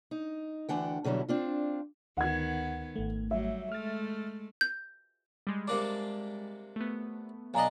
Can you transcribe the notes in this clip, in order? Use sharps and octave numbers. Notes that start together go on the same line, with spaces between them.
D#4
D2 C#3 E3 D4 F#5 G5
B2 D3 F#3 G3 E4
C4 D4 F4
D2 D#3 B3 F#5 G#6
G#1 A3
F#3 G3 E5
G#3 A3 F6 A6
G6
G3 G#3
C3 A#3 D4 D6
A3 B3
B1 D4 D#5 F5 G#5 A#5